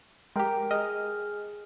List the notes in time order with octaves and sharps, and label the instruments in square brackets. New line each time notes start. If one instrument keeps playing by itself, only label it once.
[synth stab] G#3 G4 [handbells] A#4 G5 A#5
[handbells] G#4 G#5 F6 [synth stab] D#5